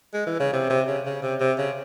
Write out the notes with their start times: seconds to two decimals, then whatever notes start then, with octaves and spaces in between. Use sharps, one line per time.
0.14 G#3
0.27 E3
0.40 C#3
0.53 C3
0.70 C3
0.87 C#3
1.06 C#3
1.23 C3
1.40 C3
1.58 C#3